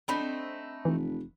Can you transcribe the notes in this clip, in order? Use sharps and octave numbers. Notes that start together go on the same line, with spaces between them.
A3 C4 D4 D#4 B5
F1 E3